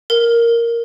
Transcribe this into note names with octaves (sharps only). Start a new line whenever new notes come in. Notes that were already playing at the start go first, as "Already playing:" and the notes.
A#4